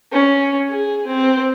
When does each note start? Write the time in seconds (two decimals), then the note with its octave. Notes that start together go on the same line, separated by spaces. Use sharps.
0.12 C#4
0.69 G#4
1.07 C4